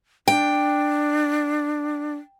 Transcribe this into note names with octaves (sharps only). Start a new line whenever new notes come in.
D4 G5